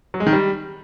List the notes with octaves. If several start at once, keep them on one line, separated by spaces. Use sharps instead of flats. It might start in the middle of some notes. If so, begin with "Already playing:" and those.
F#3
G#3
D#3
G3